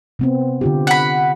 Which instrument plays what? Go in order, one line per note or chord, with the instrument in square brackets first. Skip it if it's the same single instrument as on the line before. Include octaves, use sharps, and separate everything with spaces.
[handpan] C3 B3 C4
D3 F4 G4
[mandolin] F#5 B5